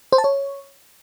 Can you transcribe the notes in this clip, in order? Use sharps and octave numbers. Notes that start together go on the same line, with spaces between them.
C5
A5
C#5